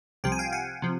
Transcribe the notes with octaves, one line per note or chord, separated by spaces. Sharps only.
C2 C3 F3 G5
G#5
F5 G5
F#5 G#5
C3 F3